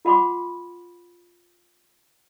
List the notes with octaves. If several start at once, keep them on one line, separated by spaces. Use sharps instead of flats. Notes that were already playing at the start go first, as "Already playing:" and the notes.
F4 F#5 B5 C6 D6